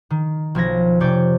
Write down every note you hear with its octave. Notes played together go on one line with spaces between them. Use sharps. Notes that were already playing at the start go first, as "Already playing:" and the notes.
D#3
B1 F3 G#6 A#6
F1 C3 C#5 D5 G6